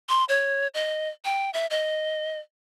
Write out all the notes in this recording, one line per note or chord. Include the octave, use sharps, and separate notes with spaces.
C6
C#5
D#5
G5
E5
D#5